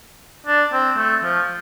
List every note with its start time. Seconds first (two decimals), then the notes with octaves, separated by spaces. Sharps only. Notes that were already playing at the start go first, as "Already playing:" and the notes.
0.46 D4
0.72 C4
0.97 A3
1.23 F3